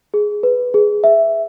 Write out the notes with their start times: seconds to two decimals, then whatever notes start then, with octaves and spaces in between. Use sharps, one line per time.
0.14 G#4
0.43 B4
0.74 G#4
1.04 E5